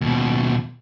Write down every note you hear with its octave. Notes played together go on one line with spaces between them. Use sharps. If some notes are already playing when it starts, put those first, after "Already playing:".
D#2 B2